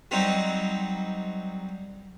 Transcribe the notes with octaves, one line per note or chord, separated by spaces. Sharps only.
F#3 G3 C4 D#4